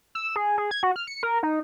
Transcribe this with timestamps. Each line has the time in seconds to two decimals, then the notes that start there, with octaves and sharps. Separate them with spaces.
0.15 E6
0.36 G#4
0.58 G#4
0.71 G#6
0.83 F#4
0.96 F6
1.07 C#7
1.23 A#4
1.43 D#4